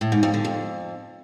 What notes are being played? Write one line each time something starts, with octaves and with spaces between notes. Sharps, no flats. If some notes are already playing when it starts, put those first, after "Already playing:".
A2
G#2
F2
D3
F2